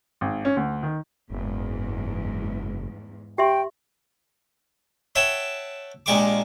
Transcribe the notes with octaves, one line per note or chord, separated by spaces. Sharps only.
G#1
C#4
D2
D#3
F#1 E2 G#2
G4 E5 G5 C6
C#5 E5 F#5 G5 A5
A#1 A#2 G#3 G4 C#6 D6